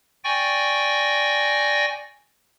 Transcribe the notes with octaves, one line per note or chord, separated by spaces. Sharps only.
D5 G5 G#5 C#6 A#6